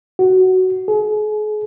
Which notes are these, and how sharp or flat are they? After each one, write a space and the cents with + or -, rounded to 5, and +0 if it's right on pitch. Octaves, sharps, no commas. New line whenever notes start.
F#4 +10
G#4 +40